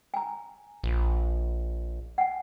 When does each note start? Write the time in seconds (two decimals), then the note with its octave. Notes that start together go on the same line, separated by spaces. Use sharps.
0.14 G#5 A#5
0.84 A#1
2.18 F#5 G#5